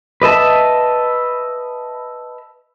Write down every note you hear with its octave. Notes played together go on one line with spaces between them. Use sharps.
B4 D#5 E5 A5